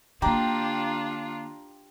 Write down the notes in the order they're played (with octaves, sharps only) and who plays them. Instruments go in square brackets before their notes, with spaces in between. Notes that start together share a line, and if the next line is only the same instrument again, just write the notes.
[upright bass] D3 A#3 [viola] D4 F4 [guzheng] G4 [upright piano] A#5